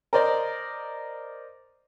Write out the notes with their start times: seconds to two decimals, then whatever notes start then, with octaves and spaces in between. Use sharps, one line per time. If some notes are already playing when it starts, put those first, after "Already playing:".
0.13 A#4 C5 D5 D#5